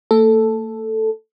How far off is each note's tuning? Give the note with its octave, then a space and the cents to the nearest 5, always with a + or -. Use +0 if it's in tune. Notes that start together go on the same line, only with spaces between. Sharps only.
A3 +45 A4 +0